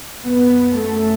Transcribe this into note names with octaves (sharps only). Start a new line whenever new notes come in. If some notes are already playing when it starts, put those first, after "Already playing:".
F#2 B3
A3